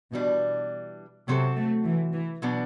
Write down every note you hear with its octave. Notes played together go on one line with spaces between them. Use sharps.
B2 E3 G3 D4
C3 F#3 C4 F#4 A4
A3
E3
E3
B2 F#3 B3 D4